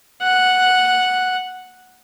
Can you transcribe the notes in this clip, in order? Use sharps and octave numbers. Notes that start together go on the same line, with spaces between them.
F#5